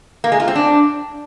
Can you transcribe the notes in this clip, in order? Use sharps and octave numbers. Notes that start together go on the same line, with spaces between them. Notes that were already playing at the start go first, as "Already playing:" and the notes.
A#3
G#3
F4
C4
D4